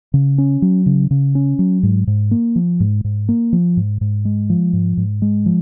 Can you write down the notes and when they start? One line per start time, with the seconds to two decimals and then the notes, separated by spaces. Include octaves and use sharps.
0.14 C#3
0.38 C#4
0.62 F#3
0.86 C#3
1.11 C#3
1.35 C#4
1.59 F#3
1.83 G#2
2.07 G#2
2.31 A#3
2.56 F3
2.80 G#2
3.04 G#2
3.29 A#3
3.53 F3
3.77 G#2
4.01 G#2
4.25 G#3
4.50 F3
4.73 G#2
4.97 G#2
5.22 G#3
5.46 F3